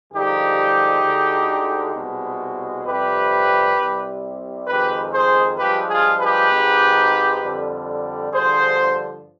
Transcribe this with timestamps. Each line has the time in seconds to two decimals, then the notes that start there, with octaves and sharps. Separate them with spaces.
0.12 G2 D3 F3 G#3 D#4 G4
1.03 D2 D3 G#3
1.95 C2 B2 G#3
2.86 F2 C3 G3 G4 B4
3.76 C2 C3 G3
4.67 F2 D#3 G#3 G4 B4
5.13 G#4 C5
5.58 G2 F3 G#3 G4 B4
5.89 F4 G#4
6.20 G4 B4
6.50 G#1 G#2 D#3 G#3
7.42 F2 D3 G3
8.31 G2 D3 F3 G#4 C5